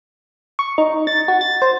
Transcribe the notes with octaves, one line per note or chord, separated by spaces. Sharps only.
C#6
D#4
A6
F#4
A6
C5